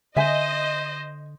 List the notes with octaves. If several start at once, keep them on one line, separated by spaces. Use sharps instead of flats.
D3 C5 D#5 E5 G#5